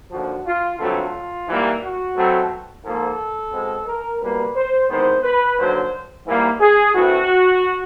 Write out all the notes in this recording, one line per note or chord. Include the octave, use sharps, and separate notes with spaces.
D#2 D3 F3 F#4
F4
G2 D3 F#3 A3 C4 F4
G#2 E3 G3 A#3
F#4
B2 F#3 A3 C4
G#2 F3 A#3 A4
B2 G#3 C4
A#4
C2 B2 G3 A#3 B4
C5
E2 C3 D#3 G#3 B3 C5
B4
D#2 D3 F#3 C5
G#2 E3 G3 A#3
G#4
G2 E3 A3 C4 F#4